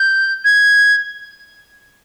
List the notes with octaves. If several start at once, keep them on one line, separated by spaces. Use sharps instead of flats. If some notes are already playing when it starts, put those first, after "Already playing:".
Already playing: G6
G#6